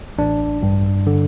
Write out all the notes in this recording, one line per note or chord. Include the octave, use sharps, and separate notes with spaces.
A1 D4
G2
D3